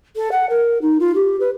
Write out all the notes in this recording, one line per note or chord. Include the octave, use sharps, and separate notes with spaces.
A4
F#5
A#4
D#4
F4
G4
B4